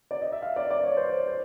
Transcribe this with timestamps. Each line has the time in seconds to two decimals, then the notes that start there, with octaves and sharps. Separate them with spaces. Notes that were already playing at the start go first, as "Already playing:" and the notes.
0.11 D5
0.22 D#5
0.32 E5
0.42 F5
0.56 D5
0.70 D5
0.83 C#5
0.97 C5
1.10 C#5
1.27 C5